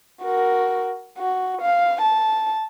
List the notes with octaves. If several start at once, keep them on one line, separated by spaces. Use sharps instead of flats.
F#4 A#4
F#4
F5
A5